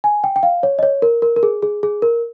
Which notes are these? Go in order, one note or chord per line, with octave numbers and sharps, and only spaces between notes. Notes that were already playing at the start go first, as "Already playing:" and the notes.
G#5
G5
G5
F5
C#5
D#5
C#5
A#4
A#4
A#4
G#4
G#4
G#4
A#4